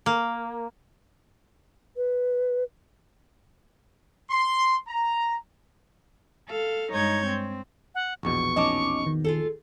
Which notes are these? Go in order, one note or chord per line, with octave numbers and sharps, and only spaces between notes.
A#3
B4
C6
A#5
A4 F5
G2 G#3 D#4 C#5 G6 G#6
C4
F#5
A#1 E2 B2 C#6
C#4 D#4 D#5 A5 D6
D#3
F4 G#4 A4